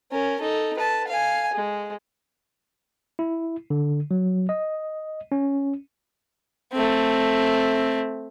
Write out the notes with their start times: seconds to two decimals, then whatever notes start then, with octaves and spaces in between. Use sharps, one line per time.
0.12 C#4 A#4
0.41 D#4 A4
0.77 B4 A5
1.08 F5 G#5
1.54 G#3
3.19 E4
3.70 D3
4.11 F#3
4.49 D#5
5.32 C#4
6.73 A3 C4